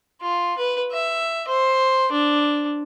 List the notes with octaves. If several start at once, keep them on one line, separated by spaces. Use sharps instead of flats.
F4
B4
E5
C5
D4